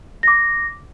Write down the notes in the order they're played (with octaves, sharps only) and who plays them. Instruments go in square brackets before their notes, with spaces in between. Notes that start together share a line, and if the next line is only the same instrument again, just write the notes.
[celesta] D6 A#6